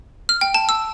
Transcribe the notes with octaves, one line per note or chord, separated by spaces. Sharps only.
F6
G5
A5
E6